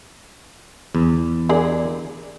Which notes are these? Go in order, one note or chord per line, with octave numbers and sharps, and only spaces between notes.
E2
D4 G#4 A#4